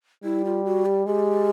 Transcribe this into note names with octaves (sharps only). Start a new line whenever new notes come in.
G3 E4
F4
F#4
G4
G#3 G4